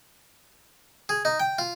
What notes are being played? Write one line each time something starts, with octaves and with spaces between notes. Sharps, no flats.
G#4
D#4
G5
F4